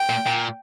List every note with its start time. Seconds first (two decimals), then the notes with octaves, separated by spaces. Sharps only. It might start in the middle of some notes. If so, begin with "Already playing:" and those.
Already playing: G5
0.10 A#2
0.27 A#2